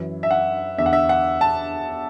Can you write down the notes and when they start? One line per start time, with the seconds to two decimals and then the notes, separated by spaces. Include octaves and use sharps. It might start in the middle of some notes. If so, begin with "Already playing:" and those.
Already playing: F#2 E3
0.23 E5
0.31 F#5
0.78 E2 D3 E5
0.86 F#5
0.93 E5
1.09 F#5
1.41 A5